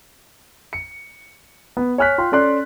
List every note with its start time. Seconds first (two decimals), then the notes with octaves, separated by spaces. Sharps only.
0.73 C#7
1.77 B3
1.98 C#5 G#5 F6 F#6 B6
2.18 F4 G5 C6
2.32 C#4 A4 D5 C6 F#6